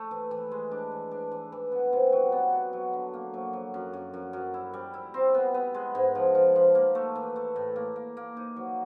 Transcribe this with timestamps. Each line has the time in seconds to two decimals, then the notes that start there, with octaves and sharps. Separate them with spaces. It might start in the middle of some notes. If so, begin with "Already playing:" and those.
Already playing: A3
0.11 E3
0.31 E3
0.51 G#3
0.71 D4
0.91 E3
1.11 D4
1.31 E3
1.52 E3
1.72 B3
1.93 C3
2.12 F#3
2.32 B3
2.53 F#4
2.73 F#3
2.93 D3
3.14 A#3
3.34 F#3
3.53 F#3
3.74 F#2
3.93 F#2
4.14 F#2
4.33 F#2
4.54 E4
4.74 G3
4.94 E4
5.14 C4
5.34 B3
5.54 B3
5.74 G#3
5.95 G#2
6.15 F3
6.35 F3
6.56 F3
6.75 A#3
6.95 A3
7.15 E3
7.36 A3
7.56 A2
7.76 A#3
7.96 A#3
8.17 A#3
8.37 D#4
8.56 F#3